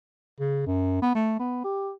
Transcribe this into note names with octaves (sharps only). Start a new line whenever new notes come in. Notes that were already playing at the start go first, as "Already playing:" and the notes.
C#3
F#2
B3
A3
B3
G4